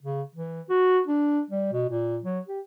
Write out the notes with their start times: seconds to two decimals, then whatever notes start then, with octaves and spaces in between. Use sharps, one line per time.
0.02 C#3
0.35 E3
0.69 F#4
1.06 D4
1.50 G3
1.72 B2
1.88 A#2
2.23 F#3
2.48 G4